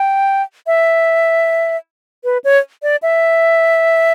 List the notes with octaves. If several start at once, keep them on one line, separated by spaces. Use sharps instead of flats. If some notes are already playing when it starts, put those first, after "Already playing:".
Already playing: G5
E5
B4
C#5
D5
E5